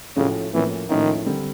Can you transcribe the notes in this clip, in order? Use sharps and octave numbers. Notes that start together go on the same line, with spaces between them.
A2 C#3 F3 A3 C#4 F#4
A2 E3 F3 A#3 C#4
A2 D#3 F3 A#3 C#4 E4
D3 G3 C4